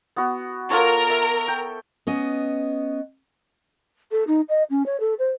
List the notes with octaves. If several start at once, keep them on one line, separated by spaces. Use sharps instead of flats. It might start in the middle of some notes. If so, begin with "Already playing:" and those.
B3 F#4
F4 A4 A#4 C#5
E5
G5
B3 C#4 D#5
A4
D#4
D#5
C#4
C#5
A4
C5